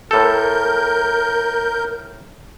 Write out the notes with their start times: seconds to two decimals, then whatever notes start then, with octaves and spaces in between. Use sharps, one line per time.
0.11 A2 A4 A#4 G6